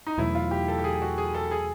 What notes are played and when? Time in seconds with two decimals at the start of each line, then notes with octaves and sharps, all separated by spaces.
0.07 D#4
0.18 E2 B2 F#3 A3 E4
0.35 F4
0.51 G4
0.68 A4
0.79 G4
0.84 G#4
1.02 F#4
1.18 G#4
1.35 A4
1.51 G#4